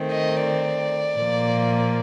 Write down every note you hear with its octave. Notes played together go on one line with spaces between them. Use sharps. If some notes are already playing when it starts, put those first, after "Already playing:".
Already playing: D#3 A3 C4
D#5
D5
A#2 F3 A#3